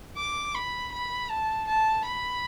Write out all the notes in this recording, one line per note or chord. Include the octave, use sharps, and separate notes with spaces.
D6
B5
B5
A5
A5
B5